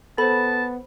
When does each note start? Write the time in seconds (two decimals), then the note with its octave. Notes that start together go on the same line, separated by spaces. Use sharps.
0.18 B3 A4 C5 A5 B5